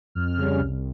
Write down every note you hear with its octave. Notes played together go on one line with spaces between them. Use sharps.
F2 F6
C#3 G3 C#4
C2